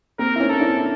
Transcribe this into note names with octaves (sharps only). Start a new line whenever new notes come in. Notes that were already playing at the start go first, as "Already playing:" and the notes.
A#3 C4 A#4
E4
C#4 D#4
A4
D4 E4